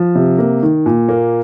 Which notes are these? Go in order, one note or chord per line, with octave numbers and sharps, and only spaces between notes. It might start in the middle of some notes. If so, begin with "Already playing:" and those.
Already playing: F3
C3
A#3
D#3
A#2
A#3